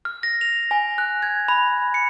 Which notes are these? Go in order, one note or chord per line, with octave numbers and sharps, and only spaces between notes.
F6
A#6
F7
G#5
F#6
G#6
B5
C#7